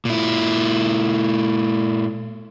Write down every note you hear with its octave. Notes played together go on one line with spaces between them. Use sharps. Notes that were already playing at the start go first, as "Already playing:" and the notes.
A#2 E4